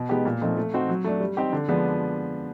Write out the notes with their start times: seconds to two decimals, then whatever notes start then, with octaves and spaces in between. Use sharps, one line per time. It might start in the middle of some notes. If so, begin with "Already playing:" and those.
Already playing: B2
0.09 G#3 B3 D#4 G4
0.25 A#2
0.41 F3 A3 C4 D#4
0.57 A3
0.74 C4 D#4 F#4
0.89 F#3
1.04 A3 D4
1.20 G3
1.37 C4 D#4 G4
1.53 D3
1.68 F3 G#3 B3 D4